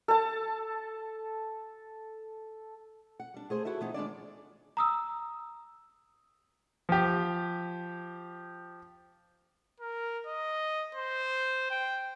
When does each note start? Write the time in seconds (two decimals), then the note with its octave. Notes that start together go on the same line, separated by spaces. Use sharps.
0.08 A4 A5
3.20 F#5
3.34 G3 D4
3.50 A3 G#4 C5
3.65 E4 F#4 A4 E5
3.81 E3 B3 D#4
3.94 D#3 G#3 D4 D5
4.77 A#5 D#6 E6
6.89 F3 G4
9.80 A#4
10.26 D#5
10.95 C5
11.70 G5